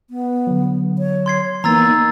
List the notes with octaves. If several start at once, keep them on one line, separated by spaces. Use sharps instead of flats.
B3
D3 F#3
C#5
C6 G#6 C7
E3 A#3 B3 D#4 A#5 E6 A6
D#4